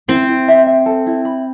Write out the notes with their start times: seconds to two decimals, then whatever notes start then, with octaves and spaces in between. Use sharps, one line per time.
0.08 C4 E4
0.29 E4
0.48 E5
0.66 E5
0.86 A4
1.06 E4
1.25 B5